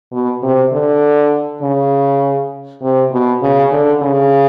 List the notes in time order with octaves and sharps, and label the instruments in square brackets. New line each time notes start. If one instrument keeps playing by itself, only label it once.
[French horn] B2
C3
D3
C#3
C3
B2
C#3
D3
C#3